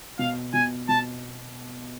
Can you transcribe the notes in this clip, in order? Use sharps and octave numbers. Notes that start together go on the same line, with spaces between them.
B2 F5
B2 G#5
B2 A5